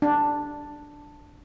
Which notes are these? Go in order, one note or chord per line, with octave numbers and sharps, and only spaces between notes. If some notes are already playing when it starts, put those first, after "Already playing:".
D4